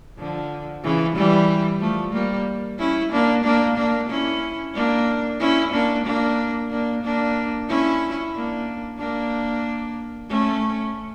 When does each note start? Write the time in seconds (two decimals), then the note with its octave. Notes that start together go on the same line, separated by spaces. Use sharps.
0.18 D3 F3
0.83 C#3 E3
1.16 E3 G3
1.81 F3 A3
2.13 G3 A#3
2.79 C#4 E4
3.12 A#3 D4
3.44 A#3 D4
3.77 A#3 D4
4.09 C#4 E4
4.74 A#3 D4
5.40 C#4 E4
5.73 A#3 D4
6.06 A#3 D4
6.70 A#3 D4
7.03 A#3 D4
7.69 C#4 E4
8.34 A#3 D4
8.99 A#3 D4
10.29 A3 C#4